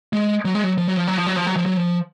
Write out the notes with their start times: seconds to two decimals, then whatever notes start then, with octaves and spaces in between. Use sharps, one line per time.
0.13 G#3
0.45 F#3
0.55 G#3
0.63 F#3
0.78 F3
0.88 F#3
0.97 F3
1.07 F#3
1.17 F3
1.27 F#3
1.36 F3
1.47 F#3
1.56 F3
1.66 F#3
1.77 F3